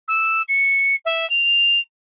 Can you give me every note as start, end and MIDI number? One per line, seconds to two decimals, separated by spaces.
0.08 0.42 88
0.48 0.96 97
1.06 1.28 76
1.30 1.79 101